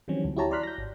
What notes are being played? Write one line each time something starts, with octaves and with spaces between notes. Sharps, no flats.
D#3 E3 F#3 G3 C4 C#4
D2
E4 F#4 G4 C#5 A5 A#5
D5 A#5 C6 F6 F#6 B6
G6 A#6
G#1